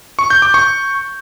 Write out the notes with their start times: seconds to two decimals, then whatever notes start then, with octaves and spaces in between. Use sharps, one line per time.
0.19 C#6
0.30 G6
0.42 D6
0.54 C#6